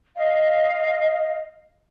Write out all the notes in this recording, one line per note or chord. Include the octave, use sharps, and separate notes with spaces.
D#5 F5